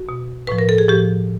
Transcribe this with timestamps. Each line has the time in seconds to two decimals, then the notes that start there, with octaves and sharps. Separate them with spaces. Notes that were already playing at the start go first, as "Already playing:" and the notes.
Already playing: F#4
0.09 B2
0.47 A2 F3 B4
0.59 A#4
0.69 A4
0.78 G#4
0.88 A2 F3 G4